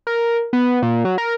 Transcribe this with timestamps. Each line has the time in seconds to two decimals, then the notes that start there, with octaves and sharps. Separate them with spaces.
0.07 A#4
0.53 B3
0.82 A#2
1.05 F#3
1.18 A#4